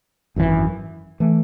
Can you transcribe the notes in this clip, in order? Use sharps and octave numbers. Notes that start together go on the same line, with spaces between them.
G#1 F#2 C#3 E3
E3 A3